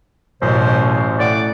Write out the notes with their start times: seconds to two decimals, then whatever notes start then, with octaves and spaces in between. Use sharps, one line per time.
0.42 A1 F#2 B2 C5
1.19 A2 D5 F#5 D6